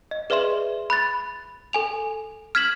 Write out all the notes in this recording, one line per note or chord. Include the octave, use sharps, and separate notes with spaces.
D#5
G#4 B4 D5 E5 C6 E7
B5 F#6 A6
A4 G#5 F7
F6 G#6 B6 E7 F#7